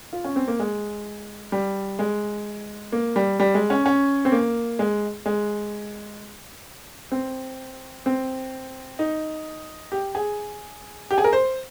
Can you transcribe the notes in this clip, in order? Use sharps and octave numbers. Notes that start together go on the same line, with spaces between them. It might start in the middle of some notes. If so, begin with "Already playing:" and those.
F4
C#4
C4
A#3
G#3
G3
G#3
A#3
G3
G3
G#3
C#4
C#4
C4
A#3
G#3
G#3
C4
C4
D#4
G4
G#4
G4
G#4
A#4
C5